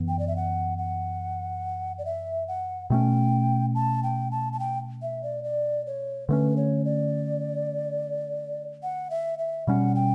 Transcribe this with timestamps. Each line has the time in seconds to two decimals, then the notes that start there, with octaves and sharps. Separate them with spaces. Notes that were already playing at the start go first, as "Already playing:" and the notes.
Already playing: F#2 E3 B3
0.08 G5
0.19 D5
0.28 E5
0.36 F#5
0.78 F#5
1.98 D5
2.05 E5
2.48 F#5
2.90 B2 A3 C#4 G5
3.75 A5
4.03 G5
4.31 A5
4.53 A5
4.59 G5
5.02 E5
5.23 D5
5.44 D5
5.87 C#5
6.29 D3 A3 C#4 B4
6.57 C#5
6.85 D5
8.83 F#5
9.11 E5
9.39 E5
9.67 B2 G3 C#4 F#5
9.95 G5